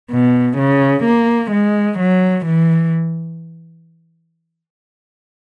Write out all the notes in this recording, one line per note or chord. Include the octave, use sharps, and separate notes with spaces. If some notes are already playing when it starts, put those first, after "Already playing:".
B2
C#3
A#3
G#3
F#3
E3